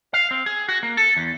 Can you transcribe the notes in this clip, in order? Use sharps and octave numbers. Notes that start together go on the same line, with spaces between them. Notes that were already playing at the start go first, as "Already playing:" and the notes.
F5
C4
G#4
F#4
A#3
A4
E2